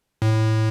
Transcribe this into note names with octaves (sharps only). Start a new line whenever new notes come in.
A2